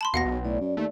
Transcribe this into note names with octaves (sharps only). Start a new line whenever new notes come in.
A5 B5 C6
D#2 B2 F5 F#5 A#6
B1
A2 D5
F#2
D#2 A3